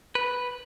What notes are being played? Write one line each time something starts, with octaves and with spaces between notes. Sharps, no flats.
B4